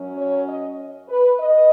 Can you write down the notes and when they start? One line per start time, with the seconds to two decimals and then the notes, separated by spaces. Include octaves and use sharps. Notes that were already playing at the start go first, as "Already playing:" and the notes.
Already playing: F#2 F#3 C#4
0.18 C#5
0.49 D#5
1.09 B4
1.40 D#5